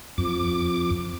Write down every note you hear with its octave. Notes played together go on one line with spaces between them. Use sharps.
F2 D6